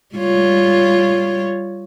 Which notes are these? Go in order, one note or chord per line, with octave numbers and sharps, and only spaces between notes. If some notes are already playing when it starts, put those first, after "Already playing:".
G3 F4 C#5